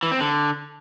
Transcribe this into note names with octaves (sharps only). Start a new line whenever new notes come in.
E3
C4
D3